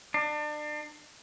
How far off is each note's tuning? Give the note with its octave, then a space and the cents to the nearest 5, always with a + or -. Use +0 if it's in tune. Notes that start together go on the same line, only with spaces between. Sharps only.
D4 +35